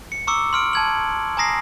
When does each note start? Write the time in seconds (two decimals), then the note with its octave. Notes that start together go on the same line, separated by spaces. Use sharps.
0.12 C#7
0.27 A#5 C#6 D6 E6 C#7
0.53 C6 F6 D7
0.73 A5 G#6 F#7
1.37 G#5 A#5 D#6 A#6 C7